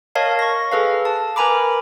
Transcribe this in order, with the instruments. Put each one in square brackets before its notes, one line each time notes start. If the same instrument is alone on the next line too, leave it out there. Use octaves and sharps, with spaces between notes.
[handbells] A#4 C#5 D#5 F5 A5
C#6 A#6
G#4 A4 B4 F5
A5
A#4 B4 G#5 A#5 B5 D6